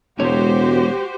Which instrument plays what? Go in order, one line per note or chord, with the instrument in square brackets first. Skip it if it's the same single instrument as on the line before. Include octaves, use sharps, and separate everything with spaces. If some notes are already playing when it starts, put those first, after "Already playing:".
[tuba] E1 [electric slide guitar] E2 G#3 C#5 [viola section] F#4 G4 C5